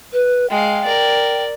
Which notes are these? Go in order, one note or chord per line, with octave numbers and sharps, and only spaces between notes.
B4
G#3 F5 G5
A#4 D5